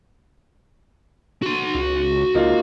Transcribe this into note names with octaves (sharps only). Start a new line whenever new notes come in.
F#4 C6
C#2
C#2 A#3 D#4 F4